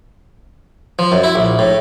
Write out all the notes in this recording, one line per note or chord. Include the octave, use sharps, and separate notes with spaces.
F3
F#2
E4
A#1
A2